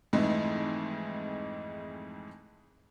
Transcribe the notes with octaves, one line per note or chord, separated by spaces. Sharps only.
F2 G#2 E3 G#3 A3